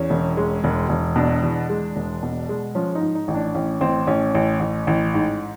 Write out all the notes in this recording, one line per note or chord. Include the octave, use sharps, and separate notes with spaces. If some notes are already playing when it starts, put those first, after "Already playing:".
Already playing: E2 C#4
E1
G#3
E1
E1
B2 D4
E2
G#3
E1
B2
G#3
F3 C#4
D#4
G#2
D#4
A1
D4
A1 C#4
A1 C4
A1 C#4
A1
A1
A1
G#2